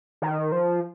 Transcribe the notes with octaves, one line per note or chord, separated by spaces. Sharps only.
D#3
F3